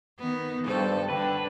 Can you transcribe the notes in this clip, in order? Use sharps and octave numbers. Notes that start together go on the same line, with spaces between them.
D#3 B3
B1 G2 A4 C5
D3 B4 G5